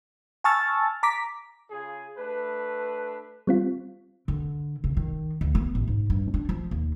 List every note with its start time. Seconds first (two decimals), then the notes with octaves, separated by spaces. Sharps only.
0.44 G#5 A5 C#6 E6 F6 A6
1.03 A#5 D6 B6
1.71 C#3 F4 G#4
2.17 A3 D4 B4
3.47 G3 C4 F4
4.28 D3
4.84 C#3
4.97 D#3
5.41 D2
5.55 B3
5.75 A1
5.88 G#2
6.10 G2
6.34 D4
6.49 F3
6.71 D#2